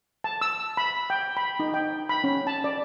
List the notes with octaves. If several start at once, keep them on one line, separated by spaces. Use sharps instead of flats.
A5
E6
B5
G5
B5
D#4
G5
B5
C#4
A5
D5